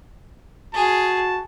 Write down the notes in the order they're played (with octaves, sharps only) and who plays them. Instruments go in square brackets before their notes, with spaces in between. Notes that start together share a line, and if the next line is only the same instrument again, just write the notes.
[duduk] F#4 [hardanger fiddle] G#4 [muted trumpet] A5